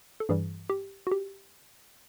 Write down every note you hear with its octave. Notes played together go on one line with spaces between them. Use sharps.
A4
G2 E3 G3 G#4
G4
F#4
G4